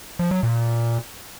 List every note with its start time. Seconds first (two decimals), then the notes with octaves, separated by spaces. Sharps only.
0.19 F3
0.31 F#3
0.43 A#2